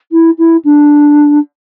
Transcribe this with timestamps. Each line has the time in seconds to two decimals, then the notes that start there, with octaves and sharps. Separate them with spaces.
0.12 E4
0.38 E4
0.64 D4